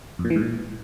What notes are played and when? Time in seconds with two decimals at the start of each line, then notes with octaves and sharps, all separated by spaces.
0.19 F2
0.25 A#2
0.30 E3
0.36 G#2
0.41 A#2